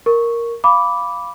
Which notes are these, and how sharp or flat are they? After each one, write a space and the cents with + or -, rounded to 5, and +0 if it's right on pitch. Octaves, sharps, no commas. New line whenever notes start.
A#4 +0 C#6 +0
F5 +0 B5 +0 D6 -5